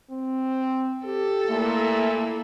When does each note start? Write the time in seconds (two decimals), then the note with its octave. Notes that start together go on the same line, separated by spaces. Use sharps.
0.10 C4
1.06 G4 A4
1.49 A#2 A3 A#3 E4